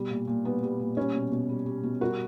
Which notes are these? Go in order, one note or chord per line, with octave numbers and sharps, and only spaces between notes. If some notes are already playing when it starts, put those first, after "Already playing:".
Already playing: B2 G3
A#2
A#2
G3 B3
G3
A#2
G3 C#4
B2
B2
G3
G3
B2
G3 F#4 A#4